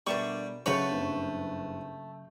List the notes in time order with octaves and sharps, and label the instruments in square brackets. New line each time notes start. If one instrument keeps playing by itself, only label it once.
[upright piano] B2 A#4 E7 [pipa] D3 A3 C#6 [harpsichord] G3
[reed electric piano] C#3 F#3 C#6 [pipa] A3 F#4 C#5 [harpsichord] B4 [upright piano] G6
[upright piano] F#1 G2 C4